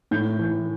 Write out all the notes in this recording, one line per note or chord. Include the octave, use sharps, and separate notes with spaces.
A2 G6
E3